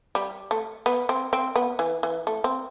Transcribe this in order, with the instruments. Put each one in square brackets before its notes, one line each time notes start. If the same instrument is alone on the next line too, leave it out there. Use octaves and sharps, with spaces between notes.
[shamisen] G3
A3
B3
C4
C4
B3
E3
E3
A3
C4